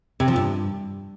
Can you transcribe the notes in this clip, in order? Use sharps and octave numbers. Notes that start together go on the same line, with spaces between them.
C3
F3
G2